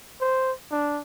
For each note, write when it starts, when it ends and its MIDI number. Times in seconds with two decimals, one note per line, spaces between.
0.21 0.52 72
0.72 1.01 62